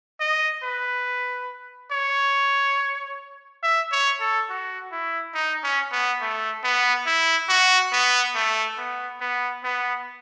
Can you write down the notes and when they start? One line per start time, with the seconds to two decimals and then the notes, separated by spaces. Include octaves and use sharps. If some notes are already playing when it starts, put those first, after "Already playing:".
0.20 D#5
0.63 B4
1.92 C#5
3.63 E5
3.92 C#5
4.20 A4
4.49 F#4
4.92 E4
5.34 D#4
5.63 C#4
5.92 B3
6.21 A3
6.63 B3
7.06 E4
7.49 F#4
7.92 B3
8.35 A3
8.77 B3
9.21 B3
9.64 B3